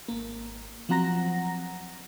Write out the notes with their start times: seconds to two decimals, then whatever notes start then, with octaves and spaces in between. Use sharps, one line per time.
0.08 G#1 A#3
0.89 F3 F#3 C4 F#5 A#5 A#6